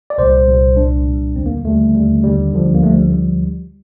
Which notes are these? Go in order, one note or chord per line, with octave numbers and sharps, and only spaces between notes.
D5
C2 A#2 G3 C5
C2 A#2 G3
C2 A#2 G3 D4
C2 A#2 G3
D#2 D3 G3 C4
A#3
D#2 D3 G3 A3
D#2 D3 G3
D#2 D3 G3
D2 D3 F3
A#3
D2 D3 F3 A3
G3
G3
D2 D3 F3